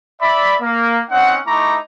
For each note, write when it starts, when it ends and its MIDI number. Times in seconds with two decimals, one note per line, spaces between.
0.21 0.55 74
0.21 0.55 76
0.21 0.55 83
0.62 0.99 58
1.10 1.37 60
1.10 1.37 61
1.10 1.37 63
1.10 1.37 78
1.47 1.76 57
1.47 1.76 63
1.47 1.76 64
1.47 1.76 82
1.47 1.76 85
1.47 1.76 86